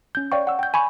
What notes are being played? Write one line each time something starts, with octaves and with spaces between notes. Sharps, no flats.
C#4 G6
C#5 D5 F5 G5 C#6
F#5 E6
G5 G6
G#5 B5 C#6